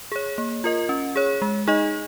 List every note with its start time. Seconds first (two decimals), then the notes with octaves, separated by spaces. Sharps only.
0.12 G#4 C#5
0.38 A#3
0.64 F4 A#4 D#5
0.89 C#4
1.16 G#4 C#5
1.42 G#3
1.67 D#4 G#4 D#5